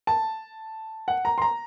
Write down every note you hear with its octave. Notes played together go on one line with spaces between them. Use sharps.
A5
F#5
A#5
C6
A#5